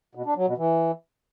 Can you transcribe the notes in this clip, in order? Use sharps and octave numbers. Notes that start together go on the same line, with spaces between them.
B2
D4
F#3
B2
E3